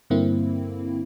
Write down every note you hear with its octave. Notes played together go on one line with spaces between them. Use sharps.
G2 D3 A#3 C4 E4